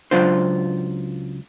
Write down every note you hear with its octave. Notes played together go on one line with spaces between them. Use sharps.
C#2 F#3 D4 F4 C5